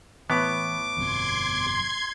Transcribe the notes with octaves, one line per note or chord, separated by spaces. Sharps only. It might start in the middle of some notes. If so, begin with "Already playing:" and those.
A2 E3 B3 D6
G1 F2 B2 C6 G#6